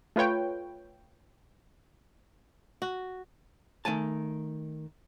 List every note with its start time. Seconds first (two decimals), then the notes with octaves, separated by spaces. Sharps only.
0.16 A3 F4 B4 C#5 G5
2.82 F#4
3.85 D#3 A3 G#5 A5